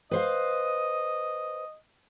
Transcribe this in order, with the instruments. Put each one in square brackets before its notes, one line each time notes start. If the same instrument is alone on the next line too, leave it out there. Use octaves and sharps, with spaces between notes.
[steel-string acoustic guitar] B4 C5 F5 [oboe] D#5